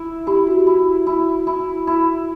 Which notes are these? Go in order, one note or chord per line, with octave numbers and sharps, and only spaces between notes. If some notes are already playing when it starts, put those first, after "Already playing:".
Already playing: E4
E4 G4
F#4
E4
E4
E4
E4